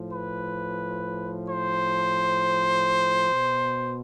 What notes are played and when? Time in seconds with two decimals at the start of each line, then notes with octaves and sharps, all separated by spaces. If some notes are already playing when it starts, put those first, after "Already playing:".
Already playing: A2 F3
0.11 B4
1.50 C5
3.32 B2